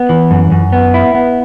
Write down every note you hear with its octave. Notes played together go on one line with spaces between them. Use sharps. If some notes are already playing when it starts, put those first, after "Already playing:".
Already playing: B3
E3
F#2
F#2
B3
E4
B3